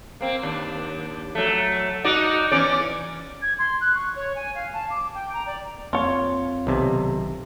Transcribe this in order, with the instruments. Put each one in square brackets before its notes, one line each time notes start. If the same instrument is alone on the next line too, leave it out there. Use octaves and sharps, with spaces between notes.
[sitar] A#3 C4
D#2 D4
F#3 A3
D#4 F#4 D5
E2 C#4 D5
[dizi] G#6
C6
F#6
C#6
C#5
G#5
F5
A5
D6
G5
A#5
D5
[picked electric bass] F2 A#3 C4 [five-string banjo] F4 C#5
[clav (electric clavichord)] B1 C3 [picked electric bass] D#3